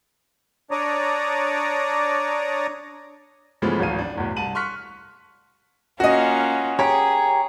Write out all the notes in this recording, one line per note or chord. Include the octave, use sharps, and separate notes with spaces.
D4 C#5 D5 A#5 D#6
C#3 E3 F3 G#3 A3 B3
D1 G#1 E3 F5 D#7
D4
B1 E2 A2
C2 A5 D#7 F#7
C6 C#6 F6 F#6 B6 C#7
A#3 C#4 F4 F#4 D#5
G4 G#4 A#4 C#5